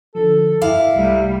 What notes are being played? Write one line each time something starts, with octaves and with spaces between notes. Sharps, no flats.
D3 F3 A4
G2 E4 F5 G5 D6
C2 C3 G3 A3